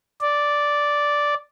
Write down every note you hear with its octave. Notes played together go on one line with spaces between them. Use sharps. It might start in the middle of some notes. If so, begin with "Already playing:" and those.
D5